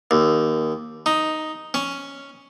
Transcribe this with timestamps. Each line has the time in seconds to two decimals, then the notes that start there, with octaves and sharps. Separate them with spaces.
0.11 D#2
1.06 D#4
1.74 C#4